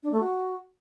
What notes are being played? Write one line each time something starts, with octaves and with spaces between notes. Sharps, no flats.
D4
A3
F#4